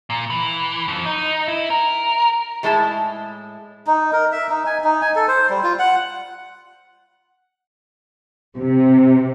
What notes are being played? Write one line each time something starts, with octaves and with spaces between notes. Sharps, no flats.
A#2
E3
F2
D#4
E4
A#4
A2 G#3 E4 A4 A5
D#4
A#4
E5
D#4
G#5
D#4
G#5
A4
C5
G3
F4
F#5
C3